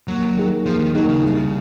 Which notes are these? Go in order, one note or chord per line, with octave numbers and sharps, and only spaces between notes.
D#2 F#3
D#3 A#3 D#4 G#4
D#2 F3
D#3
D#3 F#3 A#3 D#4 G#4
C#3
C2